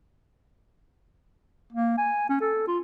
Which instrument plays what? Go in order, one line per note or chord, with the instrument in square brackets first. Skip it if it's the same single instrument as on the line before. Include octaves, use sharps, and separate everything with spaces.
[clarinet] A#3
G#5
C#4
A4
F4